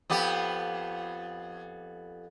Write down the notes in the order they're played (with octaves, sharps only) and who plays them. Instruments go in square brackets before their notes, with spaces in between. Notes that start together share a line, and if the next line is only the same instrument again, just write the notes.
[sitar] F2 B3 G4